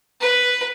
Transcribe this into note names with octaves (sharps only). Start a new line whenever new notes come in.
B4